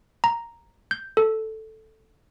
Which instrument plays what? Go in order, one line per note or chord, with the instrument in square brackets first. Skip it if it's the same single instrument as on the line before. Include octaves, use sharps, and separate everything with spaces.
[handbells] A#5
G6
A4